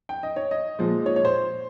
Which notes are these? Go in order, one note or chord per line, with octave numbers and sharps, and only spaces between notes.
G5
D#5
C#5
D#5
A#2 F3 G#3
C#5
C#5
C5